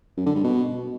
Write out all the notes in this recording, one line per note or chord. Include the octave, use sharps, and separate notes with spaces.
F#2
D3
G2
B2